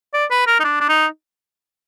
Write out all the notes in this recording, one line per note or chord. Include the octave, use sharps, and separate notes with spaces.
D5
B4
A#4
D#4
D4
D4
D#4